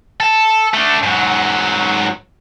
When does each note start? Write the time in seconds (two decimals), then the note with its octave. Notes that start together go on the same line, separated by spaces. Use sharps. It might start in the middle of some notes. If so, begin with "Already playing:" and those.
0.20 A4
0.74 A3 D4
1.03 G#2 F#3